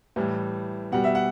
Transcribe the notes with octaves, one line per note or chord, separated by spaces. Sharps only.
A2 E3 G3
B2 G3 F#5
E5
F#5